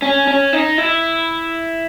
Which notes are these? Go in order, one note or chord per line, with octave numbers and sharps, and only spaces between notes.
C#4
C#4
D#4
E4